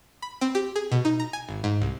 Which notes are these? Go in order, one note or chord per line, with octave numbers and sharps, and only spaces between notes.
B5
C4
G4
G#4
B2
D#4
A#5
G#5
G#1
G#2
C2